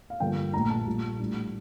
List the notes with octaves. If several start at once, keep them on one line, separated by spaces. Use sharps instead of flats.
F5
G2 D3 F3 A#3 F4 G5
A#1 A#2 A3 D4 A#5
A5
A#1 A#2 G3
A1 A2 G3 D4